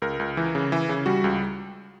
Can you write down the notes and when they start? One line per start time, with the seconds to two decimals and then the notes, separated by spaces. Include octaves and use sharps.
0.02 C#2 A#4
0.19 C#2
0.37 E3
0.55 C#3
0.72 E3
0.89 C#3
1.06 G3 F#4
1.24 C#2